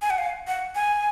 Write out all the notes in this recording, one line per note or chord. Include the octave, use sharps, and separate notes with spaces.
G#5
F#5
F5
F#5
G#5